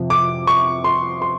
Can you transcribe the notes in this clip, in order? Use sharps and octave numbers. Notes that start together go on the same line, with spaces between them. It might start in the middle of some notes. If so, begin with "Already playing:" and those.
Already playing: F2 C3 F3
D6
C#6
C6
C6